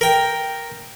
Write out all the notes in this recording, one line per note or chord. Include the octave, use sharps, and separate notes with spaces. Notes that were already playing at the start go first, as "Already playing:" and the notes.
A#4 G5